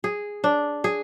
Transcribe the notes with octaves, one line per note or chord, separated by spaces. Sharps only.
G#4
D4
G#4